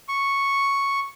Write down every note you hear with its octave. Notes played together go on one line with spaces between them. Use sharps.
C#6